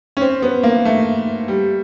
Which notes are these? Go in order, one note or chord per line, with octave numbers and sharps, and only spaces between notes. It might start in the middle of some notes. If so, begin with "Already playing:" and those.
C#4
C4
B3
A#3
A3
G3